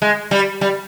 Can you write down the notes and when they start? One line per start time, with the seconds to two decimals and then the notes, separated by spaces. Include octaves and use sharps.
0.02 G#3
0.31 G3
0.61 G3